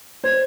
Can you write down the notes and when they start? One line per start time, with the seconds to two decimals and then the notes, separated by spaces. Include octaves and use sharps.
0.24 C5 G#6